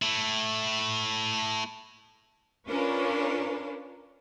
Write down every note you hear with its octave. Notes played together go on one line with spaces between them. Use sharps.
A3 E4
C#4 D4 F4 A#4 B4 C#5